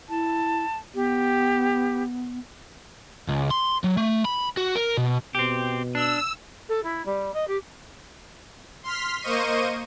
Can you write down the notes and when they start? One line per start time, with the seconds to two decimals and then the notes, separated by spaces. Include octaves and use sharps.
0.09 E4 A5
0.95 B3 G4
3.28 C#2
3.51 C6
3.84 F#3
3.97 A3
4.25 B5
4.57 F#4
4.75 A#4
4.97 B2
5.35 B2 C4 G4
5.95 D4 E6
6.68 A4
6.83 E4
7.05 G3
7.34 D#5
7.47 G4
8.83 C6 F6 B6
9.21 A#3 C5 D#5 C#6 D#7